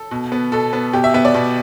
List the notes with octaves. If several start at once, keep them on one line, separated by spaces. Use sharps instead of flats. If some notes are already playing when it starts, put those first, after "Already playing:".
Already playing: A4
B2
B3
B2 A4
B3
B2 G4
E5
B3 E5
D5
B2